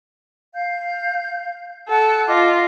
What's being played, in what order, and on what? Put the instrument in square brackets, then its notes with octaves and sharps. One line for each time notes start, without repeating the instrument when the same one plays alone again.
[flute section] F5 G6
[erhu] A4 [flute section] F#5
[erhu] F4 [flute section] D#5 D6